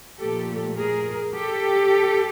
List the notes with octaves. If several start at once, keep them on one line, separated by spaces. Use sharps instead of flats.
A#2 F3 A3 G4 A4
G#4 A#4
G4 A4